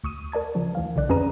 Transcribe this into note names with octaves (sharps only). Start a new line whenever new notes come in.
D2 C#6 D#6 D#7
A#4 D5 A5 G#6
C#3 F3
D2 E3 F5
B1 D3 D5 F#6
F2 C#4 G#4 B4 A#5 D#7